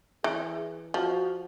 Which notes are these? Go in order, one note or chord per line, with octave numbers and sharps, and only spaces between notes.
E3 G#4
F3 F#4